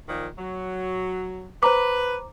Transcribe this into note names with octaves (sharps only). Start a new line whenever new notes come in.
A#2 D#3 F3
F#3
B4 C5 A#5 D6